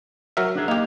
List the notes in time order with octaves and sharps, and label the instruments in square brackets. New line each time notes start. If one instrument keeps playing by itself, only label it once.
[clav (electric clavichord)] F#3 A#4 E5
[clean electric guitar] D4 G#4
[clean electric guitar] A#3 F5 [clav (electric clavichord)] D#4 G4